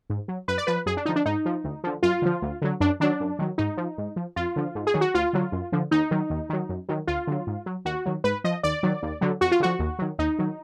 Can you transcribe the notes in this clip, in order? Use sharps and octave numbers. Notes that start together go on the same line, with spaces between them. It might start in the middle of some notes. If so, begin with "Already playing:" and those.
G#2
F#3
F#2 B4
D5
F3 B4
F#2 G#4
D4
D3 F3 D#4
D4
G#2 D#4
F3
D2
D3 F3
F#2 F4
D3 F3
D2
D3 F#3
F#2 D4
D#3 F#3 D4
F#2
D#3 F#3
G#2 D#4
F3
G#2
F3
F2 F4
D3 F3
G#2
G#4
D#3 F#3
F#4
D2 F4
D3 F#3
F#2
D3 F3
D#2 D#4
D#3 F#3
D#2
D#3 F#3
F#2
D#3 F#3
D2 F4
D3 F#3
G#2
F#3
D#2 F#4
D#3 F#3
G#2 B4
F3 D#5
D#2 D5
D#3 F#3
D#2
D3 F#3
F2 F#4
F4
D3 F3 F#4
D#2
D#3 F#3
D#2 D#4
D#3 F#3